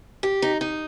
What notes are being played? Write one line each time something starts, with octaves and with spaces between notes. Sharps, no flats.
G4
D#4
D#4